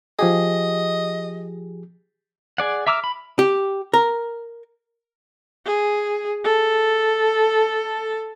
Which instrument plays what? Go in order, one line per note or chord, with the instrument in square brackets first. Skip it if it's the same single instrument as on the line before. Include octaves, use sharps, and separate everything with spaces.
[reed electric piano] F3 G4 G#4 [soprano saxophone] D#5
[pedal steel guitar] G#4 D5 F#5
E5 A#5 D6 E6 F6
B5
[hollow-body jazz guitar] G4
A#4
[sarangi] G#4
A4